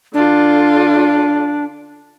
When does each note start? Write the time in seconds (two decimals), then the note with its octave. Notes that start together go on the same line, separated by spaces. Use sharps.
0.14 D3 D4 F4